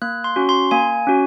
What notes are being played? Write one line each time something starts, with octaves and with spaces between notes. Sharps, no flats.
A#3 F#6
C6
C#4 F#4
C6
A#3 G#5
C#4 F#4